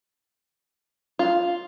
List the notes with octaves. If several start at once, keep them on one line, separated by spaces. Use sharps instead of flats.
F4